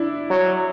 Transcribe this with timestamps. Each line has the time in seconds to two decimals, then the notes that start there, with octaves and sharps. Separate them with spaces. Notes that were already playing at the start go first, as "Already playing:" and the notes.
Already playing: D4 E4
0.30 F#3